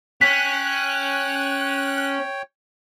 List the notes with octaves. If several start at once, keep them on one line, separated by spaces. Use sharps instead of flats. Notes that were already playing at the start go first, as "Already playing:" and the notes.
C#4 C#5 G5 F#6 B6